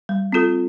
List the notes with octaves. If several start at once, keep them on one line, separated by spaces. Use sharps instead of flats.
G3
C4 F4 A4